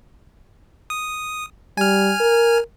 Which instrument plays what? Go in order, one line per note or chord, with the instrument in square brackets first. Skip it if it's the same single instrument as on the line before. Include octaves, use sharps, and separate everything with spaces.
[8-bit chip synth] D#6
[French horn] G3 [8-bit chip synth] G#5 F6
[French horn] A#4